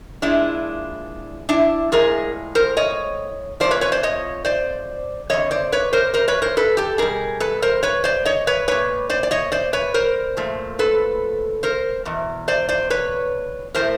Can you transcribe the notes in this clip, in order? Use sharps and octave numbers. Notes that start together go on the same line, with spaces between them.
A#2 F3 G#3 D4 E4
D4 E4
A2 F3 G#3 G#4 A#4
A#4 C5
C#5 D#5
F2 C3 F3 C5 D5
B4 C#5
B4 C#5
C5 D5
C#5 D#5
C5 D5
F2 D3 G3 C#5 D#5
C5 D5
B4 C#5
A#4 C5
A#4 C5
B4 C#5
A#4 C5
A4 B4
G4 A4
B2 G3 G#4 A#4
A4 B4
A#4 C5
B4 C#5
C5 D5
C#5 D#5
B4 C#5
A#2 G3 B4 C#5
C5 D5
D5
C#5 D#5
C5 D5
B4 C#5
A#4 C5
A#2 F3 A3
A4 B4
A#4 C5
E2 B2
C5 D5
C5 D5
B4 C#5
A2 F3 A3 A#4 C5